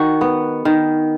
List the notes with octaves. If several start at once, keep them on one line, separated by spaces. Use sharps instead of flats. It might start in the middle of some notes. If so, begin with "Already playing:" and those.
Already playing: D#3 F#4
B3
D#3